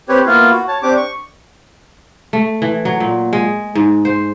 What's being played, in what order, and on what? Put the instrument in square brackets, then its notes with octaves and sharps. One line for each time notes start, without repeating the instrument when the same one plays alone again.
[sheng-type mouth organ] C4 G4 B4 C#5
A#3 B3 E4 F4 F5
F#4
C#5 A5
C4 D4 G4 D6
C#6
[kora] A3
E3
F#3
A#2
G#3
G#2
C5